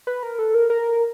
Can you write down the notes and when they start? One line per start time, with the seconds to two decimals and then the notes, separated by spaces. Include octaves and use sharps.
0.07 B4
0.23 A#4
0.39 A4
0.54 A#4
0.70 A#4